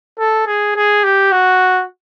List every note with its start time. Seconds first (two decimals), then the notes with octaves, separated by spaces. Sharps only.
0.19 A4
0.47 G#4
0.75 G#4
1.04 G4
1.32 F#4